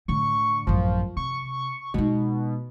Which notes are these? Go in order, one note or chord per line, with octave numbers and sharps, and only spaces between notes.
A2 D3 C#6
A1 F#2 F3
C3 C#6
B2 G#3 D#4